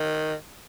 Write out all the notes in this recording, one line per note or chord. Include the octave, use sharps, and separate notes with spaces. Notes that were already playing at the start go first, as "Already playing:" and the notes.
Already playing: D#3